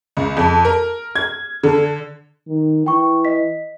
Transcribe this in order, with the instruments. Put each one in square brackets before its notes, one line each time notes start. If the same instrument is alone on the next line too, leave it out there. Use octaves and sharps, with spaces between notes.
[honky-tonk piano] C#2
F2
A#4
G#6
D3
[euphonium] D#3
[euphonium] E3 [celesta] G5 C#6
[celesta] D#5 B6